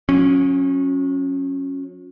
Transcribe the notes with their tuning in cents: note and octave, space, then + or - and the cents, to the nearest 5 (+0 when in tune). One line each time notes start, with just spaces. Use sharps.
F#3 -45 C#4 -15